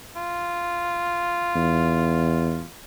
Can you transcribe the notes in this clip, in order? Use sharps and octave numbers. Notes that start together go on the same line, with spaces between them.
F4
E2